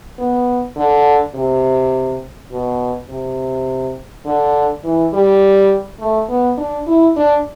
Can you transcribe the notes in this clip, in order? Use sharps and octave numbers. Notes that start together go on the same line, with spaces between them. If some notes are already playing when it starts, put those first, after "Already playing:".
B3
D3
C3
B2
C3
D3
E3
G3
A3
B3
D4
E4
D4